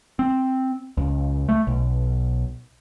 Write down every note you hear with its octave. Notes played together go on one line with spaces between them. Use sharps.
C4
C#2
A3
B1